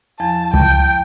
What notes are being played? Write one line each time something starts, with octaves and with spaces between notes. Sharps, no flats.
E2 F3 A5
C#2 G5 A5